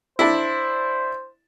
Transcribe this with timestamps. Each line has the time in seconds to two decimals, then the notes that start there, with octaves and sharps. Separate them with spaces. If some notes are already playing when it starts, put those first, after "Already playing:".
0.19 D4 E4 C5